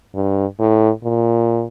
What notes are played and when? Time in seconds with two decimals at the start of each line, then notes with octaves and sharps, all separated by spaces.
0.15 G2
0.59 A2
1.04 A#2